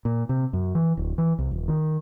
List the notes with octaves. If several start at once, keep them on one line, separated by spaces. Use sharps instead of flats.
A#2
C3
F#2
E3
D1
E3
C2
D#1
D#3